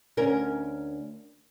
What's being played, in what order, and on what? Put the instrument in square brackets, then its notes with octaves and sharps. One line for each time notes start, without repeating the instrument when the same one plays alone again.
[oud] D2 C#4 A#4